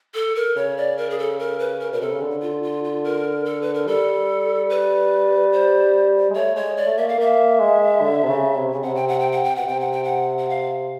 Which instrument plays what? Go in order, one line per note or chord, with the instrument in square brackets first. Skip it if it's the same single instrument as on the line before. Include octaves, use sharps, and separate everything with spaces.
[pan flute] A4
A#4
[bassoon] C#3 [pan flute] C#5
[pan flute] D5
A#4
G#4
A4
A#4
B4
A#4
[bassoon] B2 [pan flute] A#4
[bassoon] C3 [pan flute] A4
[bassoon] C#3
D3
[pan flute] F4
F4
F4
A#4
A4
B4
A#4
[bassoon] G3 [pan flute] A4
[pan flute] B4
C5
[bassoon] G#3
[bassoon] A3 [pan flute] C#5
[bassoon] G#3 [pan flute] C#5
[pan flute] D5
[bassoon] A3
[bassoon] A#3 [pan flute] E5
[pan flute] F5
[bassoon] A#3 [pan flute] E5
[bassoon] G#3
D3
C3
C#3
C3
C#3
[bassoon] C3 [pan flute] F#5
[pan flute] G5
F#5
G5
F#5
G5
[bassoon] B2 [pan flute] F#5
[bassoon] C3 [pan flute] G5
[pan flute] F#5
G5
F#5
F#5
F5